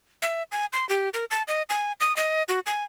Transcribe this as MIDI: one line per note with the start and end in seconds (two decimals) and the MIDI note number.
0.22 0.43 76
0.52 0.66 80
0.73 0.87 84
0.89 1.09 67
1.14 1.25 70
1.31 1.43 81
1.48 1.62 75
1.70 1.92 80
2.00 2.15 87
2.17 2.43 75
2.49 2.60 66
2.66 2.84 80